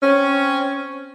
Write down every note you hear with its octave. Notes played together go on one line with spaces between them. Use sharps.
C4 C#4